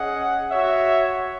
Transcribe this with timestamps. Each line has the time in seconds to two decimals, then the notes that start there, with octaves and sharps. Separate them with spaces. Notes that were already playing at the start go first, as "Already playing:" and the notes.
Already playing: C#4 G#4 D#5 F#5
0.50 F#4 C#5 E5